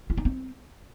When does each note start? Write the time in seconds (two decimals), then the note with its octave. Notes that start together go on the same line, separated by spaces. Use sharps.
0.10 E4
0.17 D#4
0.25 C4